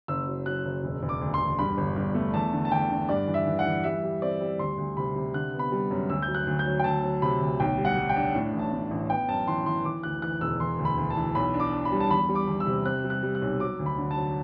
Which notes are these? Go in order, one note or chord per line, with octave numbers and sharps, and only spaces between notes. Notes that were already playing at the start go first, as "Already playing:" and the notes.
F#1 E6
F#3
F#3 F#6
F#1
E1
E1
D6
D2
C6
E1
G2 B5
G1
G2
A3
E2 A5
D3
A5
E2 G5
D3
G2 D5
E3
E5
E3
F#5
E3
G3 E5
G3
C4 D5
G3
D2 C6
D2
C3 B5
C3
D3 F#6
B3
B5
G3
F#2
D2 E6
G6
F#3
F#6
D2
G6
F#3
G5
D2 A5
F#3
C3 B5
D2
B1 G5
G3
F#5
G3
G5
D4
A2
A1
A5
A2
A1
B3 G5
F#2 A5
E3 C6
E3 C6
E3 D6
D2 F#6
E3 F#6
E1 E6
E3 C6
D2
B5
D2
A5
E3
B1 B5
D4
D6
D4
B5
G3
A5
E2 B5
G3
D6
E2
E6
C3
C4 F#6
G3
F#6
G3
F#6
B1
F#3 D6
D2
B5
D3
A5
F#3